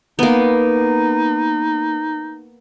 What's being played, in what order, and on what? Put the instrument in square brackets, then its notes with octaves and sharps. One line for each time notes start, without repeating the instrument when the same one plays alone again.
[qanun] A#3 B3 [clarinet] D#4